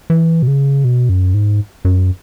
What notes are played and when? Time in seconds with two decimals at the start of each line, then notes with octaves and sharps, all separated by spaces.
0.10 E3
0.42 B2
0.47 C#3
0.84 B2
1.09 F#2
1.34 G#2
1.85 F#2